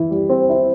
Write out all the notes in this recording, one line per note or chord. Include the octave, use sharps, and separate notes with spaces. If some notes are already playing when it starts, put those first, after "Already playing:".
Already playing: E3 E4
G3
C4
E4